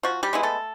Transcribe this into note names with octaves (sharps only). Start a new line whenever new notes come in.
F3 F#4
G3 G4
G#3 B3 E4
A3 A4